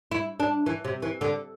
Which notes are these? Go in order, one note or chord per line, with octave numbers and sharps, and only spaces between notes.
E4
D4
E3
C3
E3
D3